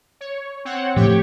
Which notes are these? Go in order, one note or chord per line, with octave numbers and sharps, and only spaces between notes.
C#5
C4 C#5 F#5
A2 F3 G4 C#5